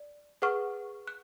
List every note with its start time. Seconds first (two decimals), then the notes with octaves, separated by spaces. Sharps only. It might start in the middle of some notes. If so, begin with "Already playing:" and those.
Already playing: D5
0.42 G#4 B4 F#5 C#6 F6
1.08 F#6